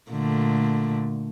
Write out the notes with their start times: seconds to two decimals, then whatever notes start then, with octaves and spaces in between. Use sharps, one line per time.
0.11 A#2 D3 A3